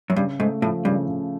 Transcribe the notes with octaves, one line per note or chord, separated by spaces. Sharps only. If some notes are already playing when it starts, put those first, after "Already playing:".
F#2
G2 C#3
G#2 A3
A2 F3
G2 C#3
C#3